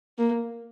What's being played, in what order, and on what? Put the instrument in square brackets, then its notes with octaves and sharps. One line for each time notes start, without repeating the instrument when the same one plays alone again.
[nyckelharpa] A#3